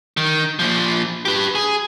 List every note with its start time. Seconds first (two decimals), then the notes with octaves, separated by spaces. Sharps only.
0.17 D#3
0.59 A#2 F3
1.25 G4 B4
1.55 G#4